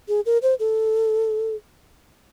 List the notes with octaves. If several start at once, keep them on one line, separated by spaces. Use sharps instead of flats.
G#4
A#4
C5
A4